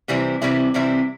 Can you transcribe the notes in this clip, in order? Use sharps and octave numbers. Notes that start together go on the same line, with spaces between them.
C3 E3 G3 C4 E4
C3 E3 G3 C4 E4
C3 E3 G3 C4 E4